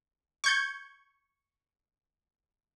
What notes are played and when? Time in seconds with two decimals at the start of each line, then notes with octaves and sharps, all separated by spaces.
0.44 C#6 G6 G#6